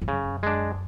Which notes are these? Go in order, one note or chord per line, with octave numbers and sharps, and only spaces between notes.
F2
F#2 C#3
G#3 D4